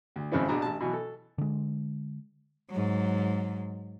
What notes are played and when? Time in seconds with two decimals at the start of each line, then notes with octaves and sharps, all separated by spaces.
0.16 D2
0.32 G#1 F2 C#3 C4 E4
0.48 A#1 B2 D4 A#5
0.62 A1 A5
0.80 B2 E3 F#3
0.93 A4
1.38 D3 G#3
2.70 G#2 F#3